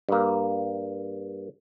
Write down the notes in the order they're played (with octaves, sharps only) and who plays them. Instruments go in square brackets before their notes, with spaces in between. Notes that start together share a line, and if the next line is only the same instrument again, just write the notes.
[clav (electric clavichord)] G2 A#3